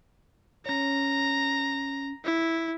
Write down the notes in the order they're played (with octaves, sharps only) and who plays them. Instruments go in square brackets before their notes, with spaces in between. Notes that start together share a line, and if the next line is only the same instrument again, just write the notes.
[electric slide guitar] C#4 C#5 [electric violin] A#5
[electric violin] E4